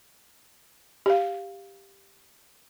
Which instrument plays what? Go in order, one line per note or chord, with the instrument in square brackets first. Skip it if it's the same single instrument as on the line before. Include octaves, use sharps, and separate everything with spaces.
[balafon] G4 F5